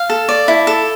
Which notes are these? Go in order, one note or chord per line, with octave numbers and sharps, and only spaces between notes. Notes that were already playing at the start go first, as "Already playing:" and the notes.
Already playing: F5
A4
D5
E4
A4